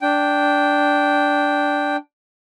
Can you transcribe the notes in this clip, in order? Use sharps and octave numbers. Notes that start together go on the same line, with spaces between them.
D4 G5